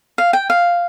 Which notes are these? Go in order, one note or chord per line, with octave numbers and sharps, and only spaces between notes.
F5
G5
F5